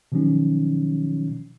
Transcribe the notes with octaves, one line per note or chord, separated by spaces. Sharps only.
B2 D#3 F3 F#3 C#4 D#4